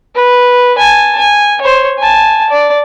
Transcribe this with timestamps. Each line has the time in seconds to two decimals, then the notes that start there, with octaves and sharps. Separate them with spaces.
0.15 B4
0.78 G#5 A5
1.18 G#5
1.61 C5 C#5
1.98 G#5 A5
2.50 D5